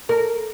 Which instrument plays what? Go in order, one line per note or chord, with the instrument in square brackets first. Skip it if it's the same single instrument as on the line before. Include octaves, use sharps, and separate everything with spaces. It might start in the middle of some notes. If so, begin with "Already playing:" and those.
[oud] A#4